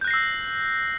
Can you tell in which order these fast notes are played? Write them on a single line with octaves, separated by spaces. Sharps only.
G6 F#6 A#6 C7 E6